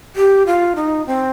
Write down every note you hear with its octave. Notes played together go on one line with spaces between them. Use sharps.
G4
F4
D#4
C4